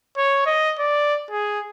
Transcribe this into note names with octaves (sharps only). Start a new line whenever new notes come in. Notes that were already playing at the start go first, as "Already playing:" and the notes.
C#5
D#5
D5
G#4